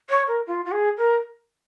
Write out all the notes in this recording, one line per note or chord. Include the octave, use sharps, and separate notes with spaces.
C#5
A#4
F4
F4
G#4
A#4